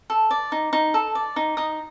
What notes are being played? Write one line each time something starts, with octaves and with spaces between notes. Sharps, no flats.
A4
D5
D#4
D#4
A4
D5
D#4
D#4 D#6